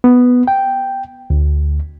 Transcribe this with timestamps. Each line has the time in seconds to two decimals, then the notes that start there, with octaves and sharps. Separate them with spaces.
0.04 B3
0.48 G5
1.30 D2